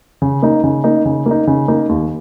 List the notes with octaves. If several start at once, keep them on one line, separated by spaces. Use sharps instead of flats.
C#3
A#3 D#4
C#3
A#3 D#4
C#3
A#3 D#4
C#3
A#3 D#4
D#2